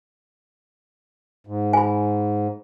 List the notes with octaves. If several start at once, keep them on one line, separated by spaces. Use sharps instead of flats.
G#2
G#5 B5